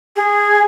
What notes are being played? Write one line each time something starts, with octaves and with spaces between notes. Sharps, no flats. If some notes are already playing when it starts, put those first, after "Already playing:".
G#4